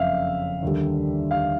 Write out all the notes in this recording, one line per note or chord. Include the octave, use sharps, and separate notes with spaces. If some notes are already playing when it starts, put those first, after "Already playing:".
Already playing: F#1 F2 C#3 E5 F5
D#2 D3 G3
F5